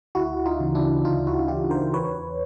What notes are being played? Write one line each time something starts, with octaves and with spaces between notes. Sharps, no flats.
D2 E4 F#4
D#4 F4
C#3 E3
D4 E4
D2 D#4 F4
E4 F#4
C#3 E3 F4 G4
A#4 C5
E2 B4 C#5